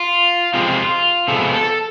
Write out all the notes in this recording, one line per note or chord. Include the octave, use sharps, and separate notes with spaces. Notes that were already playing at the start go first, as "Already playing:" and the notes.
Already playing: F4
C3 F3 G#3 C4 F4
C3 F3 G#3 B3 A4
A4